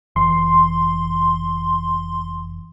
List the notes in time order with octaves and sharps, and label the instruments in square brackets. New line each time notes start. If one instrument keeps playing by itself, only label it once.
[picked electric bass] F1 E3 [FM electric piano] C6